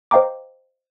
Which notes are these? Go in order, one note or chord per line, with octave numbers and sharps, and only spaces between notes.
C5 D#5 F5 G5 A#5 D6